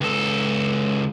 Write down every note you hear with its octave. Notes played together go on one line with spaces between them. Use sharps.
C#2 A4